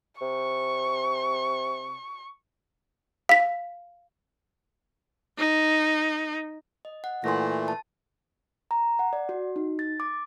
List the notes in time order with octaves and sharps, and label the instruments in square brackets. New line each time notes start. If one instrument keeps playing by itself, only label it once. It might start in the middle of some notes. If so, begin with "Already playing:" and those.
[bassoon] C3 [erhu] C#6
[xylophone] F5 B6
[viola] D#4
[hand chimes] D#5
F#5
[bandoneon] A#2 E3 A3 [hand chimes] C6 A#6
[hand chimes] A5
A#5
F#5
D5
F#4
D#4
A6
D6